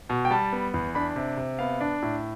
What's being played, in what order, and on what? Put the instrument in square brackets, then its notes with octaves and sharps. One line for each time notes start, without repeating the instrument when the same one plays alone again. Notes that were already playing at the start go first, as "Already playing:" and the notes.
[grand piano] B2
G5
G3 A5
B3
E2
D4 B5
C3
C3
B3 F5
D4
A2